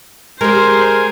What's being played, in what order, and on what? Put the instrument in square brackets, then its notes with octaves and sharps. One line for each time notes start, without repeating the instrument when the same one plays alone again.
[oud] G#3 G4 [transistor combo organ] G#4 G#5 [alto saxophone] A#4 [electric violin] C5